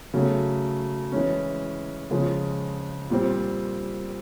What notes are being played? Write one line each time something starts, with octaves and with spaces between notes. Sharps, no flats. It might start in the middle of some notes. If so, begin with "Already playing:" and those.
C#3 F#3 A3
E3 G#3 C#4
C#3 F3 G#3
A#2 G3 C4